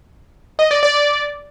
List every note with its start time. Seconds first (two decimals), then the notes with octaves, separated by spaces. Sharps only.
0.59 D#5
0.71 D5
0.83 D5